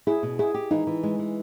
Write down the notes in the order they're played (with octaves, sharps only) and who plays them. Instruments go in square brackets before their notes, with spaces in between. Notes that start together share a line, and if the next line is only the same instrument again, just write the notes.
[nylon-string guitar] E4 [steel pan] G#4
[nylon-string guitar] B2
[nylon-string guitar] E4 [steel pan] G#4
[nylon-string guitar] G4
[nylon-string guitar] E3 [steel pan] D#4
[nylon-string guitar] E3
G#3
E3